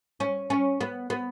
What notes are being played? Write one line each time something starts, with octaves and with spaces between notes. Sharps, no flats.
C#4
C#4
B3
B3